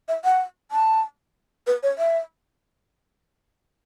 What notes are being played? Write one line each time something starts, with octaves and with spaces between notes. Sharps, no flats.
E5
F#5
A5
B4
C#5
E5